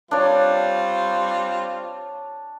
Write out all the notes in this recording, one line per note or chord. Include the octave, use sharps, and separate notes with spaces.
G3 C4 D4 F4 C#5